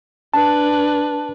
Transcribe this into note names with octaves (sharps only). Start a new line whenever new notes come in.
D4 B4 A5